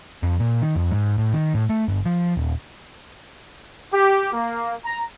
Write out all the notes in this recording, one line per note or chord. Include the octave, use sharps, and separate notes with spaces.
F2
A#2
D#3
F2
G#2
A2
D#3
A2
A3
G1
F3
D#1
G4
A#3
A#5